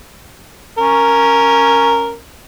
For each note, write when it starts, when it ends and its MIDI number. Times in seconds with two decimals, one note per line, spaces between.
0.78 2.16 61
0.78 2.16 70